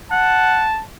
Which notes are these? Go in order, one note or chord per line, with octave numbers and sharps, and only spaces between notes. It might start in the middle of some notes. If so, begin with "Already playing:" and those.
F#5 A5